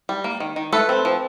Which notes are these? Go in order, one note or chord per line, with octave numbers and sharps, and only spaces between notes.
G3
A#3
D#3
D#3
A3 A4 B4
C4
F3